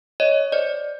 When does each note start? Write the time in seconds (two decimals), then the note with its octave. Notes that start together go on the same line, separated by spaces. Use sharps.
0.20 C#5 D#5
0.52 C5 D5